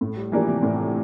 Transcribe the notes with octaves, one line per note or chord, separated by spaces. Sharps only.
A2 A3
G3
E3 F3 A#3 D4 G4
C3
A2